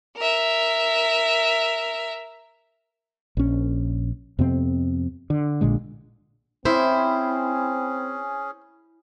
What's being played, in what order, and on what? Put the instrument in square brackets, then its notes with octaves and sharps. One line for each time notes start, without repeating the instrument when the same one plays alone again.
[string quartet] A#4 E5
[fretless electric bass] A#1 C#4
F2 C3 B3 C4
D3
A#1 A#2 D3 G#3
[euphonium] C4 [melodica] C#4 G#4 [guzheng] E4 [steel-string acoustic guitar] C5